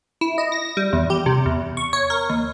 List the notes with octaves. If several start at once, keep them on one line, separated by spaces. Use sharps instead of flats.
E4
D#5
A#6
G3
E2
G4
C3
E2
C#6
C#5
A#4
D#2